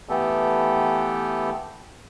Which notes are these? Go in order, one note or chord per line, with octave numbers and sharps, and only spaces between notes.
E3 A3 B3 G4 A4